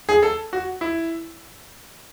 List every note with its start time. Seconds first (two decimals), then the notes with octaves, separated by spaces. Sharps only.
0.09 G#4
0.23 A4
0.53 F#4
0.81 E4